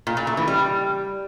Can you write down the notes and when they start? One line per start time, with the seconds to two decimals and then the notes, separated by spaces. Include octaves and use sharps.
0.07 A#2
0.17 A#2
0.27 A3
0.37 E3
0.48 G3